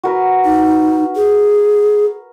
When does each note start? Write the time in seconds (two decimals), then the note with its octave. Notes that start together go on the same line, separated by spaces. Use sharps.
0.04 F#4 A#4 B4
0.45 D#4
1.16 G#4